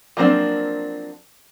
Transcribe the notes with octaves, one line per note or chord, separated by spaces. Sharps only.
F3 F#3 A#3 C4 D4